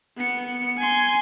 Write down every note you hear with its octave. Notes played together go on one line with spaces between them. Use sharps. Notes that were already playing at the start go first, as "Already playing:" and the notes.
B3 C#7
G#5 C6